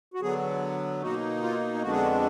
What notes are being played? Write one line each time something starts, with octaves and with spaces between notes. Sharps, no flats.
F#4
D3 F#3 B3 G#4
B2 A#3 D#4 F#4
F4
F2 D3 G#3 B3 D4 F#4
G#4
F#4